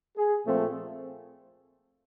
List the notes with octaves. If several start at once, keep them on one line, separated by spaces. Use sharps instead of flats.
G#4
A#2 F3 A3 C4